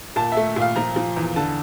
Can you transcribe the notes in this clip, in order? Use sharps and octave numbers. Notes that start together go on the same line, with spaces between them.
A#2 A5
A3 E5
A#2
F5
F3 A#5
F3
E2
D3 A5